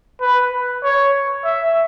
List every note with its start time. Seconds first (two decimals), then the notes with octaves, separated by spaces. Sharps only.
0.21 B4
0.84 C#5
1.44 E5